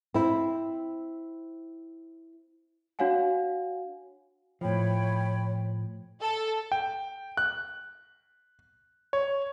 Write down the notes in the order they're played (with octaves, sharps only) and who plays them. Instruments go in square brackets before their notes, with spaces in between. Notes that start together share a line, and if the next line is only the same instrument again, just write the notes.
[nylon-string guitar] C4 E4
[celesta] D4 F#4 C#5 F5 F#5 G#5
[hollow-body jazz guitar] A2 F3 [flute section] C#5 G5 B5
[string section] A4
[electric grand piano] G5
F#6
C#5